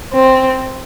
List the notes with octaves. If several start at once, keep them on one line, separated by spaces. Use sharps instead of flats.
C4